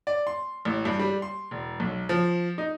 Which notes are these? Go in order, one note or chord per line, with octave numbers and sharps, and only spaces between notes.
D5
C6
A1
G2
G3
C6
E1
B1
F3
D#4